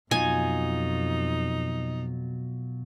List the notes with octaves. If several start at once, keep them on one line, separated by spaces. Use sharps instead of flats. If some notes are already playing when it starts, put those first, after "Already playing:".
F2 B2 F#3 D#4 F4 G#5